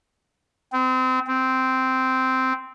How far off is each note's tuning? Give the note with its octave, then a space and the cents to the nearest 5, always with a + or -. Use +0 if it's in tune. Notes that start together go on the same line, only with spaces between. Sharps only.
C4 -30
C4 -10